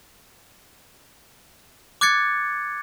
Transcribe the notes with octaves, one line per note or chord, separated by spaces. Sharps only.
D6 F#6 G#6 A6 C#7